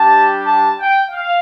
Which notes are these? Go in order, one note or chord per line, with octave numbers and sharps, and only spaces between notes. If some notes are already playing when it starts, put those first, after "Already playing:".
Already playing: G3 D4 G4 A5
A5
G5
F5